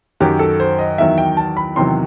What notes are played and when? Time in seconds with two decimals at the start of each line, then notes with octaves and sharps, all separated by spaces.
0.20 F#2 D#3 F#3 G4
0.39 A4
0.60 C5
0.79 D#5
0.98 E2 D#3 F#3 E5
1.18 G5
1.37 A5
1.57 B5
1.76 E2 C3 D#3 F#3 C6